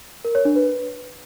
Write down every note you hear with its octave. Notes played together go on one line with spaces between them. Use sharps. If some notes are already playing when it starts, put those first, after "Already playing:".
A#4
C#5
D4
B4